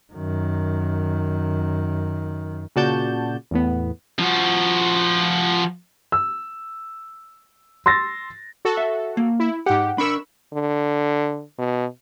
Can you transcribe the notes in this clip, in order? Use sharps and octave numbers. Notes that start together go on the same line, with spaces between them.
F#2 D#3
A#2 C#3 F#4 D5 A5 G6
E2 A2 B3
F3 F#4
E6
C6 E6 A6 A#6
F#4 A4
E5
A#3
E4
G#2 G4 F#5
D4 A#4 B5 C#6 E6
D3
B2